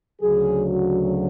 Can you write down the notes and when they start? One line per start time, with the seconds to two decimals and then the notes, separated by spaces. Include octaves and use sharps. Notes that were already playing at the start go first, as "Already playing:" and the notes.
0.21 D2 C#3 F#3 G#4
0.68 F#4